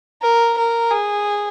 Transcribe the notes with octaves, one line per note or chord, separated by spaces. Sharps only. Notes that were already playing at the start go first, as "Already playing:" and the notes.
A#4
A#4
G#4